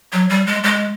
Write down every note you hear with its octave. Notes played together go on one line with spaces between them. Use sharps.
F#3
G3
G#3
G#3